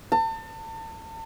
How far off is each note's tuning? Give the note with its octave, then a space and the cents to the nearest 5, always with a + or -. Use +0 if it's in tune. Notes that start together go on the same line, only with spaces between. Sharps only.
A5 +35